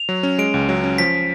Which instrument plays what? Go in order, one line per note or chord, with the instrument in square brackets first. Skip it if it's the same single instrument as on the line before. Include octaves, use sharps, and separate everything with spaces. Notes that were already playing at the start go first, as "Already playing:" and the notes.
Already playing: [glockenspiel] F7
[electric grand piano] F#3
C#4
[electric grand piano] G#3 [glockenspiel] D7
[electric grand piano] C#2
F#3
C#4
[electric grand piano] F3 [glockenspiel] B6